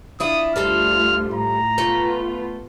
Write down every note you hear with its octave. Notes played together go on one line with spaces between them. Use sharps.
D4 E4 F4 D#6
D2 G3 F4 A4 C5 F6
A2 A#5
A3 B3 F4 A4